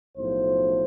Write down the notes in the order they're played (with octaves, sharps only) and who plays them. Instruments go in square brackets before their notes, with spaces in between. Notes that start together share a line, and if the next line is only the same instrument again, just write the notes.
[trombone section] B1 A2 F3 C5